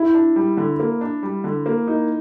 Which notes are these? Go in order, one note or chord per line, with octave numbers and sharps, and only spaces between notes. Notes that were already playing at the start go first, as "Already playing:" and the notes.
Already playing: E4
D4
G3
D3
A#3
D4
G3
D3
A#3
D#4